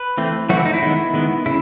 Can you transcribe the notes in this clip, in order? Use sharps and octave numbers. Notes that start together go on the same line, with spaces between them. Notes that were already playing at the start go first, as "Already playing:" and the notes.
Already playing: B4
E3 A3 C4
E3 F#3 A3 C4 F#4
E4
D#4
E4
D#3 G#3 B3
D#3 G#3 B3
C#3 E4